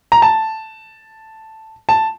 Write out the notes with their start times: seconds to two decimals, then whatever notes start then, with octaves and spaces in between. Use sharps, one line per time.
0.12 A#5
0.22 A5
1.89 A5